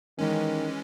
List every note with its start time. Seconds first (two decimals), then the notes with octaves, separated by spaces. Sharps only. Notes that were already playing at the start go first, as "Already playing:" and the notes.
0.19 D#3 E3 G#3 C#4